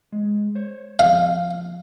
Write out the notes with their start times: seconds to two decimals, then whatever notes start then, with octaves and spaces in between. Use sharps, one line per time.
0.12 G#3
0.55 C5 C#5
0.99 F3 F5